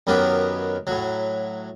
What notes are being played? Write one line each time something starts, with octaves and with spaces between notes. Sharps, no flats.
F#2 D#3 F#3 B3 G4
A2 F#3